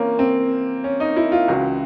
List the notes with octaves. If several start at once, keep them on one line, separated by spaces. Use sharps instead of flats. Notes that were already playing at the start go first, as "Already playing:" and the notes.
Already playing: E3 A#3 C4 C#4
C4
C#4
D#4
E4
F4
C#2 C#3 E3 F#4